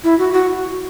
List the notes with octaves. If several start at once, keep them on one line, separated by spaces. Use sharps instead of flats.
E4
F#4
F#4